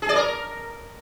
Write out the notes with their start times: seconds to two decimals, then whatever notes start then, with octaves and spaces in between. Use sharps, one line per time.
0.02 G#4
0.09 D5
0.16 A#4